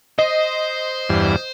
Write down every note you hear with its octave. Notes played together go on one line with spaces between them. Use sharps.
C5 D#5
E2 G2